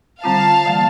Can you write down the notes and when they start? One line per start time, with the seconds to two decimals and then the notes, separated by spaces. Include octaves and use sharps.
0.23 D3 G3 C4 F4 F5 A5
0.65 E3 G3 A#3